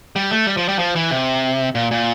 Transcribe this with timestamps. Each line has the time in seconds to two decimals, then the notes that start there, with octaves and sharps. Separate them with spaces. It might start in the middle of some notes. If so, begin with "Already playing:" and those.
0.16 G3
0.31 A3
0.46 G3
0.57 F3
0.68 G3
0.79 F3
0.95 E3
1.11 C3
1.75 A#2
1.91 A#2